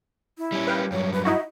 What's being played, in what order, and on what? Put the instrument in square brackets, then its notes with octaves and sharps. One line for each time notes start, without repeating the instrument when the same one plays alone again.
[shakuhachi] E4
[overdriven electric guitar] G3 C#4
[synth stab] B4 F5 G5
[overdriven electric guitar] G2 F#3 [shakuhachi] C#5
[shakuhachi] B4
[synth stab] D#4 E4 F#4 [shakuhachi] D#5